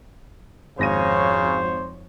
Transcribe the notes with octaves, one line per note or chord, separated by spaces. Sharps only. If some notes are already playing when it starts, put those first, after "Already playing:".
G#1 F2 C#3 C5 C#5 A#6 D#7